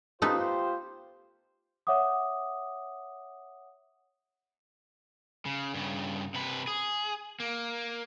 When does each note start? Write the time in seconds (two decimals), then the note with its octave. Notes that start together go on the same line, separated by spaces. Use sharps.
0.22 A3 B3 D#4 F4 G4 C5
1.87 C#5 E5 F#5 D6 D#6
5.46 C#3
5.74 G2 C#3
6.34 C3 B4
6.67 G#4
7.40 A#3